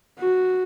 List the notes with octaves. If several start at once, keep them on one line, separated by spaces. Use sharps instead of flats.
F#4